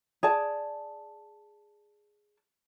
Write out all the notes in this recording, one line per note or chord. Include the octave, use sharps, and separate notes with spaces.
G#4 D5 A5